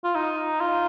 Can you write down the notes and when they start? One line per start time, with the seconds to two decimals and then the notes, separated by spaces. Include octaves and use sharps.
0.04 F4
0.15 D#4
0.61 F4